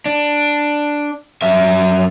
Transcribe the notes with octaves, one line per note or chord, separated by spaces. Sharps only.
D4
F#2 E5